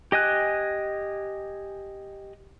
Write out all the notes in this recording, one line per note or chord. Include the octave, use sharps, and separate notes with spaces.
G4 D#5 G#5 F#6